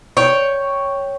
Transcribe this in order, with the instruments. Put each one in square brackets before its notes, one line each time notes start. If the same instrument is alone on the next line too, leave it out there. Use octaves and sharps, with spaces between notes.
[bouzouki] C#5 G5